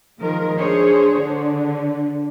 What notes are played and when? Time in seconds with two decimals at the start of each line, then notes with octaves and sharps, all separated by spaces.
0.20 D#3 F3 G#3 A#4
0.58 D4 G#4 C5 C#5
1.18 D3 D4